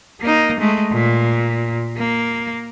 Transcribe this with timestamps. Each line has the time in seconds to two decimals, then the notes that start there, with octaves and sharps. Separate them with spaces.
0.21 A#3 D#4
0.60 G#3 A3
0.92 A#2
1.98 A#3